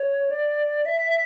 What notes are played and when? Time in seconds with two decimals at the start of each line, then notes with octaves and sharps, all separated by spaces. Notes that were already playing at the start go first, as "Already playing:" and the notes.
Already playing: C#5
0.31 D5
0.86 E5